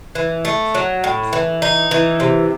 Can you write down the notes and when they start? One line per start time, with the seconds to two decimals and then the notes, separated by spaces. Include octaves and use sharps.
0.15 E3
0.45 A3
0.75 F#3
1.04 A2
1.33 E3
1.62 D#4
1.91 E3
2.20 C3